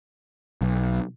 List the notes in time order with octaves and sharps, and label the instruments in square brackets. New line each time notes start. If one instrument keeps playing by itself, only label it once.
[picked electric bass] B1